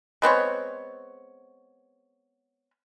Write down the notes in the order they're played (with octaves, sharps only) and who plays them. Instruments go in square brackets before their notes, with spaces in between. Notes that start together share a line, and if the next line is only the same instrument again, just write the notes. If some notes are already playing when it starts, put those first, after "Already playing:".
[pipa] G#3 B3 C4 C#5